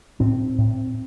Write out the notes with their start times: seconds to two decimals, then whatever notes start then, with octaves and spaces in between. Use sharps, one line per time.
0.20 A2 C4
0.58 A2